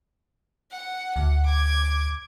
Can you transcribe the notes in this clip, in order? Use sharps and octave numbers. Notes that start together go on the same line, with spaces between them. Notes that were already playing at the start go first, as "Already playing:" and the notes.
F#5
D2 F#5
D6 G#6